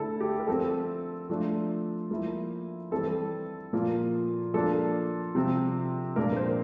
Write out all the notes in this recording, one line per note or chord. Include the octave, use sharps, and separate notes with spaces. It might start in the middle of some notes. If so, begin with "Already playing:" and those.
Already playing: D3 A3 E4 A4
G4
A#4
F3 C4 F4 A4
F3 A3 D4 F4
F3 A#3 E4
E3 G3 C4 A4
A#2 F3 A#3 F4
F3 A#3 D4 A4
C3 F3 C4
A#2 F3 A#3 D4 A#4
A#4
C5